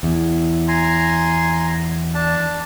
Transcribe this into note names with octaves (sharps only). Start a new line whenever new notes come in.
E2
G#5 A#5 C6
D4 A5